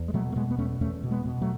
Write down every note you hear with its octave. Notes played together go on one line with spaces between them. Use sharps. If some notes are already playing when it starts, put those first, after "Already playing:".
Already playing: E2
G#3
B2 F#3 A3
A3
B2 G#3 B3
B3
E2 A3 C#4
E2 A3 C#4
B2
G#3 B3
B2
F#3 A3